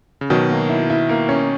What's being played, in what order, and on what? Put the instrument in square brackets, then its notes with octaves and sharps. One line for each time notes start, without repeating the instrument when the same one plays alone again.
[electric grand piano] C#3
[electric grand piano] B2 D#3 [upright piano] F#3
[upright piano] A#3
E4
E4
A#3
C#4